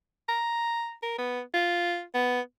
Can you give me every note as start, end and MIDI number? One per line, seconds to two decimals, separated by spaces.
0.28 0.93 82
1.02 1.17 70
1.18 1.41 59
1.54 2.03 65
2.14 2.41 59